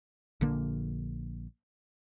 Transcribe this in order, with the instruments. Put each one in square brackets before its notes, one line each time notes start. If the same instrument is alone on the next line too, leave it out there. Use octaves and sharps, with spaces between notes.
[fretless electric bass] A#1 D3 A#3